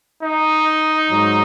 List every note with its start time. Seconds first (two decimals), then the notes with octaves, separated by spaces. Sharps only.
0.23 D#4
1.08 G#2 F#3